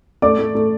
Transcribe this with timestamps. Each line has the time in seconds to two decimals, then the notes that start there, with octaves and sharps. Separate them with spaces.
0.22 A3 D5 D6
0.39 A3
0.55 A3